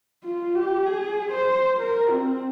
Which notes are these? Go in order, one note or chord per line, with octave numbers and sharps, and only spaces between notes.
F4
G4
G#4
C5
A#4
C4